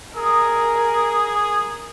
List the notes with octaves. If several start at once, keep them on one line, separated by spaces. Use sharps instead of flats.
G#4 A#4 D#6